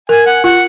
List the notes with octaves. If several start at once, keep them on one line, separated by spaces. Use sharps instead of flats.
A#4 G#5
F#5
F4 F#5